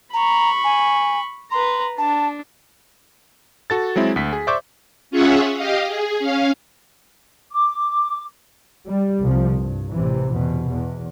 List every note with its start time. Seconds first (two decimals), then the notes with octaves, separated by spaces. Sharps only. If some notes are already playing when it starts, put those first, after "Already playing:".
0.14 A#5 B5 C#6
0.64 G#5
1.51 B4 A#5 C6
1.98 D4 A5
3.70 F#4 A4 A6
3.96 F#3 G#3 C4 E4
4.16 D2 B6
4.33 G#4
4.47 C5 D5 E5 C#6 D6 G6
5.11 C#4 F4 G#4 C#5 E5 F#5
5.55 G4 D#5 F5
5.87 G#4
6.19 C#4 F5
7.53 D6
8.86 G3
9.22 C2 C3 F3
9.58 G2
9.92 A1 C3 E3
10.30 E2 B2
10.68 E2